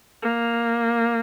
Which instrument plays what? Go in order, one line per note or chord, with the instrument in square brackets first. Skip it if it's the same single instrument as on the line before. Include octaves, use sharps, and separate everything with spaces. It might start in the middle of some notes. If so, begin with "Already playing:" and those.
[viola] A#3